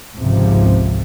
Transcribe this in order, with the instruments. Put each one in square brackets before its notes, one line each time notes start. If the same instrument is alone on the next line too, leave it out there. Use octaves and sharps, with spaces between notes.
[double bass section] G#1 C#2 G#2 C3 F3